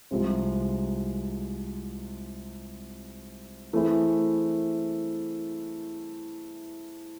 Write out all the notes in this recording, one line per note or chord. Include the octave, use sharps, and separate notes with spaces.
C2 C3 F3 G#3 C4
E3 A3 C4 E4 G#4